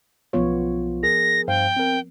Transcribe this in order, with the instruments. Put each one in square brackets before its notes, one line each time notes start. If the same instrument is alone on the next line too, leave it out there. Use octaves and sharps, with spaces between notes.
[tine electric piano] B1 F4 [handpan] F3 B3 C#5
[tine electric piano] G#4 A#4 [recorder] A#6
[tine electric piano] G2 C5 F5 [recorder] G5
[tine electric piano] C4 A#4